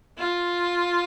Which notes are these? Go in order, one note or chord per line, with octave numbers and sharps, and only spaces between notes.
F4